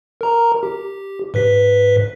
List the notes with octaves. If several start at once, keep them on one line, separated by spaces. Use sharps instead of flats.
A#4 A#5
G4
G#2 B4 B6